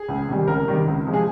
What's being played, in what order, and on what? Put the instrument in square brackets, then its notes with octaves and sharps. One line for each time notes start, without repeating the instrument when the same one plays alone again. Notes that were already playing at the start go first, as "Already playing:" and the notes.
Already playing: [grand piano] G#4
C#2
C3 D#3 G3
C#2 A#4
C3 D#3 G3
C#2
C3 F3 G#3
G#4